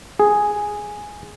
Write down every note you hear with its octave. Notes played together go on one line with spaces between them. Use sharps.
G#4